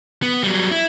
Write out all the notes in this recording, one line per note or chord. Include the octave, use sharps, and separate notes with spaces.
B3
F#3 G3
E4